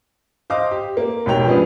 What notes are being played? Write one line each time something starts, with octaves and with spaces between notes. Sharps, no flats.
C5 D#5 F5 D6
G4
A#3
E1 G#2 G4 C#5 G5 F7
F3 B3 C#4 D4 G#4 B4